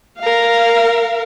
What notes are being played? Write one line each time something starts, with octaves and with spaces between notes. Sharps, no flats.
A#4 F5